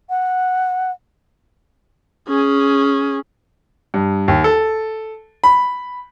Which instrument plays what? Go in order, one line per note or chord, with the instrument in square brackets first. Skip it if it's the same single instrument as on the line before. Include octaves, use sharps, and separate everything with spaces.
[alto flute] F#5
[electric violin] C#4 G#4
[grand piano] G2
D#2
A4
B5